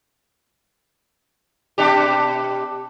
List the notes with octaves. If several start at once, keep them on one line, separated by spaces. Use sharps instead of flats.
B2 D4 G4